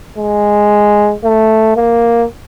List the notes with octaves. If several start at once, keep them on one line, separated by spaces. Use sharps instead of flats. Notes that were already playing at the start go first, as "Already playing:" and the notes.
G#3
A3
A#3